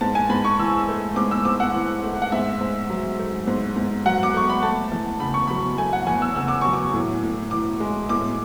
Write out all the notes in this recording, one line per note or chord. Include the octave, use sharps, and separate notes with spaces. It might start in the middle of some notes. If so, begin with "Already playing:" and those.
G#2 A5
G#5
G#2 B5
C#6
E3 E6
A3
G#2 D6
E6
G#2 D6
F#5
E3
A3
F#5
G#2 E5
G#2
F#3
A3
G#2
G#2
F#3 F#5
D6
A3 C#6
B5
A3 A5
E2
C#3 B5
C#6
F#3 B5
A3 G#5
F#5
E2 G#5
E6
C#3 E6
D6
F#3 C#6
D6
A2
A2
E3 D6
G#3
A2 D6